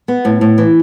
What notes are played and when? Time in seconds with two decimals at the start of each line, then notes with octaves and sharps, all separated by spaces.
0.08 B3
0.25 A2
0.41 A2
0.58 E3